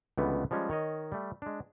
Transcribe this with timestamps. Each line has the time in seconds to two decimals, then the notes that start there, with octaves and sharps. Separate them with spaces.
0.18 C#2 D3 E3 G3 A3 B3
0.51 F3 G3 G#3 C#4
0.69 D#3 C#5 D#5
1.12 G3 A3
1.42 G#3 D4